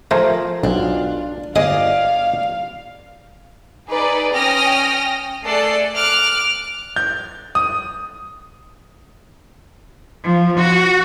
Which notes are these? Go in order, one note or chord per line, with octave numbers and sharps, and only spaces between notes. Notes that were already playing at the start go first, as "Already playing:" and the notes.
F3 A3 A#4 C5 G#5
B1 D4 F4
G1 G#4 D5 D#5 F5
D#4 G#4 B4 D5
C#4 G5 D#6 F6 A#6
A3 G#4 A4 D5 F#6 C7
D6 F6 F#6
G6
D#6
F3
F#4